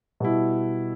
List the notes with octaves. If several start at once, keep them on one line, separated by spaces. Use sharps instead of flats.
B2 G3 E4